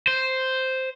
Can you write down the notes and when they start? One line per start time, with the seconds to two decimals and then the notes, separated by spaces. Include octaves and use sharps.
0.07 C5